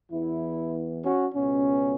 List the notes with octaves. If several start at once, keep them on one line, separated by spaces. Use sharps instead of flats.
E2 E3 B3 E4
C#4 F#4
C#2 B2 B3 C#4